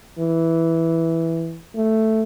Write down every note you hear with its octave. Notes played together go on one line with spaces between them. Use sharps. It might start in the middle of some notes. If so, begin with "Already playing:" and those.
E3
A3